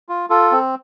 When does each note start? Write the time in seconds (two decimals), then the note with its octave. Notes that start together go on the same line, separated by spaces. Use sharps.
0.09 F4
0.30 F4 A4
0.51 C4